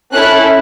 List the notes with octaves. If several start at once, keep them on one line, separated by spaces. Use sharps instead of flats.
C#4 E4 A4 F#6